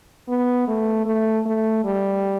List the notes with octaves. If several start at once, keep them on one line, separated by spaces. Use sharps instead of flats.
B3
A3
A3
A3
G3